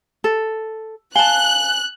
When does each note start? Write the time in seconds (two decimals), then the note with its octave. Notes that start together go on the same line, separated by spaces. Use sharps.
0.24 A4
1.15 F5 G#5 A5 F#6 G7